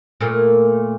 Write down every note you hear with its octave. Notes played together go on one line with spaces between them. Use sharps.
A#2 A3 A#3